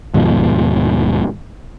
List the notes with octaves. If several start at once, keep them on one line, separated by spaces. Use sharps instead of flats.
D#2 G#2 B2 F3